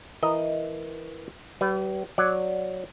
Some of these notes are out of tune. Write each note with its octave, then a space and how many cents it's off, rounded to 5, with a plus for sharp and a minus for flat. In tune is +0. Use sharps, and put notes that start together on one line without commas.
E3 +0 A#4 +0 D#5 +0
G3 -40 B4 +10
F#3 -5 D5 +0